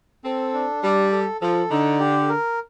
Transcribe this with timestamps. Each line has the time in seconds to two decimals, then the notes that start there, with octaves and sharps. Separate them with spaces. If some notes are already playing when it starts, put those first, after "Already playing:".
0.24 C4 A4
0.53 D4
0.83 G3 D5
1.12 A4
1.41 F3 A4
1.70 D3 D#4
1.99 G4
2.29 A#4